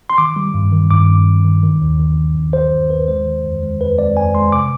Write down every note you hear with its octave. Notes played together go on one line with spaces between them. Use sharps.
C6
D#3 D6
G3
G2
D#3
G2 D6
G2
G3
D#3
D#3
D#2
D#3
D#2
D#2
D#3 C5
D#2
D#2 B4
G#3 C5
D#3
F2
G#3
F2 B4
G#3 D5
F2 G#5
G#3 C6
C3 D6